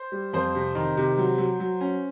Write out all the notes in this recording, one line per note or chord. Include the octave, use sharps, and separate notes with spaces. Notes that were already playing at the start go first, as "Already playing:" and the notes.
Already playing: C5
G3
F2 C5
C3
D#3
C3
F#3
F#3
F#3
C#4